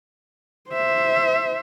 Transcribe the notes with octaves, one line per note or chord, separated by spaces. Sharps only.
C5 E5